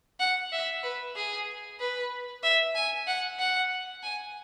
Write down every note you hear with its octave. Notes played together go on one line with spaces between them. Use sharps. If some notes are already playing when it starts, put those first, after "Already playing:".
F#5
E5
B4
G#4
B4
E5
G#5
F#5
F#5
G#5